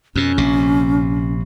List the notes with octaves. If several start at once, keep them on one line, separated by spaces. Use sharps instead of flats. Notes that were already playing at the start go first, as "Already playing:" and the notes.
F2 B2 C#4
A#1 C3